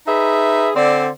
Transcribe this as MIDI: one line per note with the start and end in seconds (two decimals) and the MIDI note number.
0.07 0.71 63
0.07 0.71 68
0.07 0.71 71
0.07 0.71 76
0.76 1.08 50
0.76 1.08 60
0.76 1.08 72
0.76 1.08 74